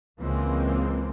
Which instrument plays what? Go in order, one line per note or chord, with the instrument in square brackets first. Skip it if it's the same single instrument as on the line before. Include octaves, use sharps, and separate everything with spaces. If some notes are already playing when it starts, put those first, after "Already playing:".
[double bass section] C#2 E3 G#3 A#3 C4